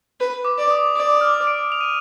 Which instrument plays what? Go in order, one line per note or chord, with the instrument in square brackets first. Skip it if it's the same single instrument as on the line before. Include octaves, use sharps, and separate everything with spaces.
[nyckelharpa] B4
[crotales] D6
[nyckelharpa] D5
[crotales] D#6
[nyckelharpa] D5 [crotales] D#6
[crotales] D#6
F6
D7
F7
D#7